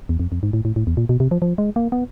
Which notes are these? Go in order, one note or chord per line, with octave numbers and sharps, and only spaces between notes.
E2
F2
F2
G#2
A2
A2
A2
E2
A#2
B2
C3
F3
F3
G#3
A#3
B3